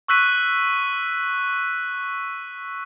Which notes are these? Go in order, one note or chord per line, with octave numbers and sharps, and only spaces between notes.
C#6 E6 F#6 B6 D#7